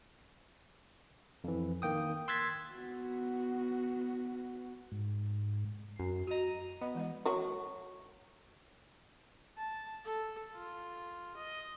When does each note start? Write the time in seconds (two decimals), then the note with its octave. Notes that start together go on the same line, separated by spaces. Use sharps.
1.44 F2 E3
1.82 D#3 A#3 G5 D#6
2.28 C6 E6 F#6 G#6 A6 B6
2.73 B3 F#4
4.92 G#2
5.96 F#2 C7
6.27 F#4 D#5 A#5 D#7
6.81 B3 D#5
6.95 E3 G#3 D#5
7.25 F#3 F#4 C#5
9.57 A5
10.05 A4
10.54 F4
11.37 D#5